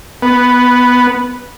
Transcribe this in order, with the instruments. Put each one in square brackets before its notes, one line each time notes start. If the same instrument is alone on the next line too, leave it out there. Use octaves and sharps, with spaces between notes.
[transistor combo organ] B3